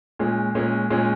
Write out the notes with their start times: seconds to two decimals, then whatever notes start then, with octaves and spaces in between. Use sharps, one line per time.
0.19 A#2 G#3 C#4
0.55 A#2 G#3 C#4
0.90 A#2 G#3 C#4